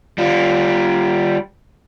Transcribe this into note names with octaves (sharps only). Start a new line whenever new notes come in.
G3 F4